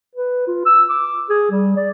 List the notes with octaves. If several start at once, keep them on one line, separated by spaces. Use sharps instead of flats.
B4
F4
E6
D6
G#4
G3
D5